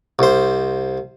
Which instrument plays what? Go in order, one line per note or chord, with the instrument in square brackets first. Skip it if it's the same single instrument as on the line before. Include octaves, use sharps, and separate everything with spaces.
[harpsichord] C2 C5